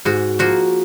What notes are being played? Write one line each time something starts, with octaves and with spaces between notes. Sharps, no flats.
G#2 F#4
F3 A#3 F#4